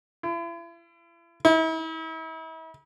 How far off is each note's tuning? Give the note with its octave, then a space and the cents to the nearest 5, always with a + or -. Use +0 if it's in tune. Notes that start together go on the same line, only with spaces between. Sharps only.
E4 +40
E4 -40